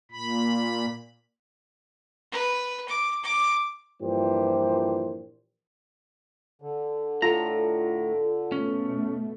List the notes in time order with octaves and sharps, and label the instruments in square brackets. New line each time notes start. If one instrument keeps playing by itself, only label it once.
[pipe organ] A#2 B5
[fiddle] B4
D6
D6
[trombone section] G2 A#2 E3 F3 G4 C5
[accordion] D3
[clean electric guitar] A2 A#5 [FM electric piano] F4 A4
[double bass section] B2 A3 [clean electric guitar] C#4